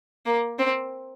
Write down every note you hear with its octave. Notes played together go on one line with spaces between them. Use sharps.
A#3
C4